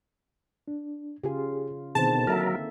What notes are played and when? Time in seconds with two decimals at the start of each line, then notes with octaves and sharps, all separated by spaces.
0.68 D4
1.24 C#3 F4 G4 G#4
1.95 B2 D3 D#3 C4 G#4 C5 A5
2.27 F#3 A#3 A4 A#4 E5 F6